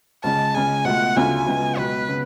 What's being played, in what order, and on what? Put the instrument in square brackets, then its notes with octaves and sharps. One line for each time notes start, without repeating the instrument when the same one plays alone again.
[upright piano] C#2 C#3 G#3 [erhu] A5
[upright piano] C#2 C#3 G#3 [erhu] G#5
[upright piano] C#2 B2 A3 F4 [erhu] F#5
[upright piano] D2 C#3 F#3 C#4 F4 [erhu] G#5
[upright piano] C#2 C#3 F#3 B3 F4
[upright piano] C#2 B2 F#3 [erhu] B4
[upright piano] C#3 F#3 B3